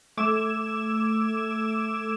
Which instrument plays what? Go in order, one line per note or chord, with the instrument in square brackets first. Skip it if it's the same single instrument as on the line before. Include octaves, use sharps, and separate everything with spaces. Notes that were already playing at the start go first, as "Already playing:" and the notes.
[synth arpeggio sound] A3 D6 E6 G#6 E7